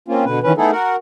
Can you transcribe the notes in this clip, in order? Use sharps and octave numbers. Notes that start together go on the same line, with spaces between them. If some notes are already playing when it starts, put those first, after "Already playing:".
A#3 C4 C#4 F4
B2 D3 B4
D#3 E3 C#4 B4
A3 B3 D#4 E4 G#4 A4
F#4 A#4 F#5